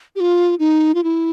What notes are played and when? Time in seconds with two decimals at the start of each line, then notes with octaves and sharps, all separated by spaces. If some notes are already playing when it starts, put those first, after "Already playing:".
0.16 G4
0.20 F4
0.59 D#4
0.95 F4
1.04 E4